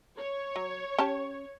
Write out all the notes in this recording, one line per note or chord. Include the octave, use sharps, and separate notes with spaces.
C#5
F#3
C#4 G4 A5